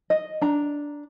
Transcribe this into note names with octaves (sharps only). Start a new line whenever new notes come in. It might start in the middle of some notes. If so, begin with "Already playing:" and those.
D#5
D4 A#5